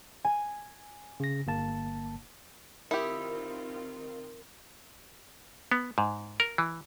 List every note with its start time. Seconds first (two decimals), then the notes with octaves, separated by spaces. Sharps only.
0.25 G#5
1.20 C#3 A#6
1.47 G1 A#3 A5
2.91 D#3 C4 E4 F4 G4 A#4
5.72 B3
5.98 G#2
6.40 A#4
6.58 E3